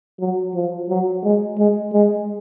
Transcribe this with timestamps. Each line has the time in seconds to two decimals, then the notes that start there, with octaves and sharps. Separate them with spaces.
0.20 F#3
0.55 F3
0.89 F#3
1.24 G#3
1.58 G#3
1.93 G#3